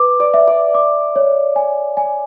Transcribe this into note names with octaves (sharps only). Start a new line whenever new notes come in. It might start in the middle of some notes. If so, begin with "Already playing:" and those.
Already playing: B4 D6
D5
E5
D5
D6
C#5
G#5
G#5